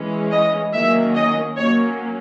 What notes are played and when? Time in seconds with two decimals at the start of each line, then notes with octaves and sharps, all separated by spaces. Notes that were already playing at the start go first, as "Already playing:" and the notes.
Already playing: E3 G#3 C#4
0.31 D#5
0.73 D#3 F#3 A#3 C#4 E5
1.14 D#5
1.56 F#3 A#3 C#4 C#5